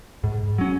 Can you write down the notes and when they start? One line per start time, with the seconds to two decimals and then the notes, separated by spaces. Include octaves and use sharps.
0.24 G#2
0.58 F#3 C#4